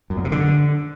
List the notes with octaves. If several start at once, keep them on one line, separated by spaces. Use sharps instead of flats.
F#2
A#2
C3
D3